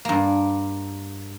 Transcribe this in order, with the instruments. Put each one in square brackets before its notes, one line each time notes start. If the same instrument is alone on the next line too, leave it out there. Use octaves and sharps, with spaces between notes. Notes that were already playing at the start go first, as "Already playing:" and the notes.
[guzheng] G2 A#3